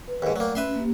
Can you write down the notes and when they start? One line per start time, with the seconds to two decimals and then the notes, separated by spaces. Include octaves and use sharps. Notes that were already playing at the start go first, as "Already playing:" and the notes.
0.08 B4
0.22 D#2 G#2
0.36 F#3 A3 A#3 D5 G5
0.55 C#4 B4 E5 C6
0.76 A#3 G4